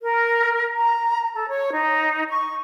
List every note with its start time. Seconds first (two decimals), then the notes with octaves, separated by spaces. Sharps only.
0.02 A#4
0.74 A#5
1.35 A4
1.48 C#5
1.73 D#4
2.30 C#6